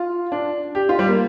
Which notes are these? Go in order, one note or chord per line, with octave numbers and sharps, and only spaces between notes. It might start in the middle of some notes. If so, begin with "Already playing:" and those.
Already playing: F4
D4
G4
F4
G3
A#3